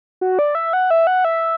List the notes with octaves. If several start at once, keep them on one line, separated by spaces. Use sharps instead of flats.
F#4
D5
E5
F#5
E5
F#5
E5